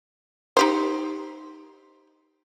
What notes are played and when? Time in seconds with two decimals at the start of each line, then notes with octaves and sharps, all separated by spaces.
0.57 D#4 G4 C5